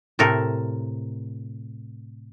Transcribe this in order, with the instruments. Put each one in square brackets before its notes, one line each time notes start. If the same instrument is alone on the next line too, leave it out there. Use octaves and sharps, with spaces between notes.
[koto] A2 C3 A4 A#4